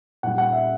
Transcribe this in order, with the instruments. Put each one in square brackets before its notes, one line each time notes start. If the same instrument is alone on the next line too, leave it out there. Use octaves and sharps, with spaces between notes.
[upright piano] A#2 G3 F#5
F#5
E5